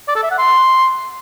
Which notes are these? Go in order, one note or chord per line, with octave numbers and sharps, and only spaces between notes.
D5
A4
E5
F#5
C6